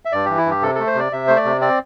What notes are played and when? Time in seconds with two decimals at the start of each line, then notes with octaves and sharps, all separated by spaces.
0.05 E5
0.12 G2 D5
0.25 E3 G4
0.37 E4
0.46 G2 G4
0.62 C3 A4
0.75 A3 A4
0.87 C5
0.95 C3 D5
1.12 C3 E5
1.27 A3 C5
1.36 D5
1.45 C3
1.61 C4 D5